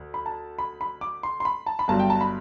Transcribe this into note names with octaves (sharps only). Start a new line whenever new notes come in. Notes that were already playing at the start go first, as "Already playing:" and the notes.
Already playing: D2
B5
A5
B5
B5
D6
C6
C6
B5
A5
B5
G1 G2 F#3 A5
G5
A5
B5